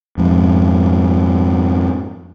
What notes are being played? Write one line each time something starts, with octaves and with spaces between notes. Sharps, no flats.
F2 G#2